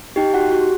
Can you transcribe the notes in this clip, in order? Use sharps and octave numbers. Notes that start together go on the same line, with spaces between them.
D#4 G4 G5
F#4 F#5
G4
F#4 F#5